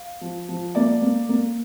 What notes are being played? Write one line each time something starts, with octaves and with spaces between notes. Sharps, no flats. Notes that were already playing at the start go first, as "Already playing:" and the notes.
Already playing: F5
F3
F3
A#3 D5
A#3
A#3